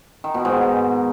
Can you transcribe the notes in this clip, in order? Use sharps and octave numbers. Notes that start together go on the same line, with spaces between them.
D#3
B2
G#2